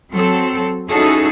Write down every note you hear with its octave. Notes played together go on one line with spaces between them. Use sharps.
F#3 C4 A4
C#4 D#4 E4 F#4 G#4 A4